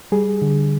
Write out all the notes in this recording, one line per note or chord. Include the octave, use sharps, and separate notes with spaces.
G3 G#4
D3